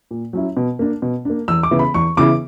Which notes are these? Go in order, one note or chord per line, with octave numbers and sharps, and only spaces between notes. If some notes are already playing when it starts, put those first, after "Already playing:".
A#2
F#3 C#4 E4
B2
A#3 D4
B2
A#3 D4
E2 E6
D6
C#3 E3 B3 E4
B5
E2 C#6
C#3 E3 B3 E4 D6